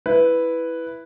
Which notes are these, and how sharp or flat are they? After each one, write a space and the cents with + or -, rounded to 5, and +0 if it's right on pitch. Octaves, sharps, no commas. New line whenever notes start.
E4 +0 B4 +0